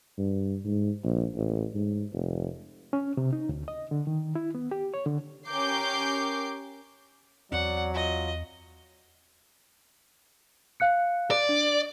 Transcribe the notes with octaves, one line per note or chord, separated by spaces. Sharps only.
G2
G#2
A#1
A1
G#2
F1
C#4
C3
D#4
D2
D#5
D3
D#3
E4
B3
G4
C#5
D3
C#4 G4 A#4 D6 G6 C7
E2 F#3 C4 D5 F#5
F4 D#5
F5 F#6 C#7
D5
D4